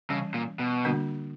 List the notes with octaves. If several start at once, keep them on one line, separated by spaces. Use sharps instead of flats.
C#3 E3 G3 C#4
A#2
B2
D3 G3 A#3 D4 F#4